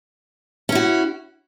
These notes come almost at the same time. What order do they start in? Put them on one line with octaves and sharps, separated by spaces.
C#4 E4 F#4